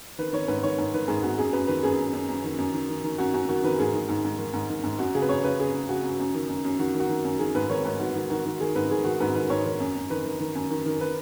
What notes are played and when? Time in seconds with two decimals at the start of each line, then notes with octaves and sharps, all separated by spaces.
0.18 D#3 B4
0.32 D#3 C#5
0.48 G#2 B4
0.63 D#3 C#5
0.78 G#2
0.94 D#3 B4
1.08 G#2 G#4
1.23 G#2 F#4
1.38 F#2 G#4
1.53 F#2 B4
1.68 D#3 B4
1.83 F#2 G#4
1.98 F#2
2.13 F#2
2.29 F#2
2.44 D#3
2.58 F#2
2.73 D#3
2.89 D#3
3.04 D#3
3.18 F#2 F#4
3.34 F#2 F#4
3.49 D#3 F#4
3.64 D#3 B4
3.79 G#2 G#4
3.93 D#3
4.09 G#2
4.24 G#2
4.39 D#3
4.53 G#2
4.70 D#3
4.84 G#2
4.99 F#2 F#4
5.14 C#3 G#4
5.22 B4
5.29 F#2 C#5
5.44 C#3 B4
5.59 C#3 G#4
5.74 C#3
5.89 C#3 F#4
6.04 F#2
6.19 F#2
6.34 D#3
6.49 F#2
6.64 F#2
6.79 D#3 F#4
6.94 D#3
7.00 F#4
7.09 D#3
7.25 F#2
7.39 D#3 G#4
7.55 G#2 B4
7.70 D#3 C#5
7.84 G#2 B4
7.99 D#3 F#4
8.15 D#3
8.30 D#3 F#4
8.45 D#3
8.60 D#3 G#4
8.75 G#2 B4
8.90 D#3 G#4
9.04 D#3 F#4
9.20 G#2 B4
9.35 D#3 B4
9.50 G#2 C#5
9.65 D#3
9.80 F#2
9.95 F#2
10.10 D#3 B4
10.25 D#3
10.40 D#3
10.55 F#2
10.70 D#3
10.86 D#3
11.01 B4